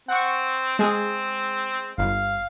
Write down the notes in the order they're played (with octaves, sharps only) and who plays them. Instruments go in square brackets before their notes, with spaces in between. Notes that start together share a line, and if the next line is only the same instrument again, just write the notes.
[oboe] C4 [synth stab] F#5 C#6
[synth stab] G#3 G#4 [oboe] C4
[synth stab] G1 [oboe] F5